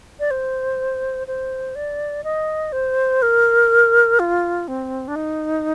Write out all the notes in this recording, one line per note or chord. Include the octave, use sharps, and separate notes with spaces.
D5
C5
C5
D5
D#5
C5
A#4
F4
C4
D4
D#4